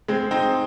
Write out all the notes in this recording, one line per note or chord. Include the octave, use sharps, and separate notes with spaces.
G#3 C4
C4 D#4